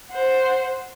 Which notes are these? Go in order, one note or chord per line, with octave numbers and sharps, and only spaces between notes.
C5 F#5